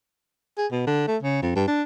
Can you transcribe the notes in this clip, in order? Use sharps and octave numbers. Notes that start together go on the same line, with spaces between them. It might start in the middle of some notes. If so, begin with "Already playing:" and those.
G#4
B2
D3
A3
C#3
F2
G2
D4